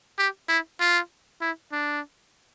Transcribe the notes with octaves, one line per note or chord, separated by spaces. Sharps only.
G4
E4
F4
E4
D4